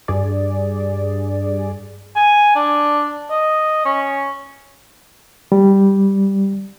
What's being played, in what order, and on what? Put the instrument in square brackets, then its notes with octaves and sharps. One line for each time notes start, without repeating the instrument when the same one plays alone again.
[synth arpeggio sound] G2 G#4 D5
[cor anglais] G#5
D4
D#5
C#4
[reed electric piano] G3